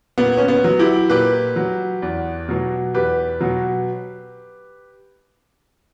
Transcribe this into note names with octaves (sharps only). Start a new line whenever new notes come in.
A#2 B3
C#4
B3
F#3
E4 G4
A#2 G4 B4
F#3
E2
B2 F#3
E2 G4 B4
B2 F#3